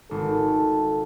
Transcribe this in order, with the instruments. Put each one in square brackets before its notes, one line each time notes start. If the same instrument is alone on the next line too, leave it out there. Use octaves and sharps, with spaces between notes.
[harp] G#1 [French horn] A4